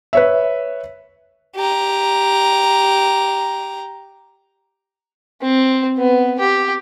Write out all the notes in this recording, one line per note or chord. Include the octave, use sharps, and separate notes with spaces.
B4 C#5 E5
G4 A#5
C4
B3
G4